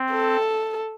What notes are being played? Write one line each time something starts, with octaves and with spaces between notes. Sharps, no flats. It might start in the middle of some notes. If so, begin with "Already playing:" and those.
Already playing: C4
A4